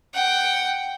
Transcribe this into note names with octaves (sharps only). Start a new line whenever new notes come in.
F#5 G5